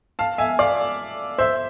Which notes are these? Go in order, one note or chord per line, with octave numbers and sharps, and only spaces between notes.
F5 A5
E5 G#5
D5 F5
C5 E5